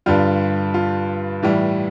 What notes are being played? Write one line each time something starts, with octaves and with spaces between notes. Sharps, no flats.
G2 D3 G3 F4
F4
A2 E3 G3